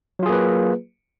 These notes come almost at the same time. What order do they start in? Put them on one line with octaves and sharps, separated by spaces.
F#3 F4 G#4 A#3 B4